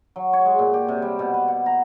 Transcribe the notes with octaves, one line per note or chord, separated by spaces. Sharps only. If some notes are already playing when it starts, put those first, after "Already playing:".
F#3
C#5
G#3
A#2
G4
C3
G3
B2
B4
F#5
A#5